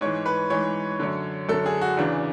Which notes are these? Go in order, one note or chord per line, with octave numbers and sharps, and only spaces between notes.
G#2 E3 C#5
B4
G#2 E3 C#5
F#2 D3
F#2 D3 A4
G#4
F#4
E2 C#3 E3 D4